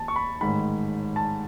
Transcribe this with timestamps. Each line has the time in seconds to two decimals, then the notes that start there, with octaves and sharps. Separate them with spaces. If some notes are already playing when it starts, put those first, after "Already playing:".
Already playing: D#2 D#3 A5
0.08 C#6
0.16 B5
0.41 A1 G#2 D#3 B5
1.16 A5